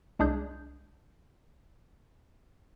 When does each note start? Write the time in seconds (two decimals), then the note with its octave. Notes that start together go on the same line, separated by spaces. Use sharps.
0.19 C2 G#3 D4 G#4 D5 G6